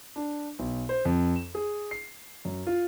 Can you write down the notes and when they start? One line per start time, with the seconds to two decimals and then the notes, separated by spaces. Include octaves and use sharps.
0.16 D4
0.59 B1
0.89 C5
1.05 F2
1.36 E7
1.55 G#4
1.91 C7
2.45 F#2
2.67 F4